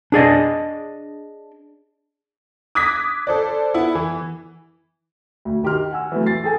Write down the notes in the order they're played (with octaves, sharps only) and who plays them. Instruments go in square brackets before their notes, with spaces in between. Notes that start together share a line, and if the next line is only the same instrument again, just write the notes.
[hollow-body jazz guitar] D4 G#4 D5 D#5
[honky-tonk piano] D6 D#6 F#6 G#6 A#6 B6
A4 C5 D5
B3 E4
E3
[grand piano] D2
D#3 G4 C6 F6
F#5 G#5 E6
E3 F#3 A3
A6 C7
G#4 A4 G5 G#5